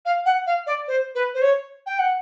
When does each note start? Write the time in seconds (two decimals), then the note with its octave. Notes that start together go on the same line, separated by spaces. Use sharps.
0.06 F5
0.26 F#5
0.47 F5
0.67 D5
0.88 C5
1.15 B4
1.34 C5
1.42 C#5
1.86 G5
1.99 F#5